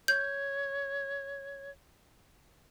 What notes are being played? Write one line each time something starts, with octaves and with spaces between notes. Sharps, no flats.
C#5 G6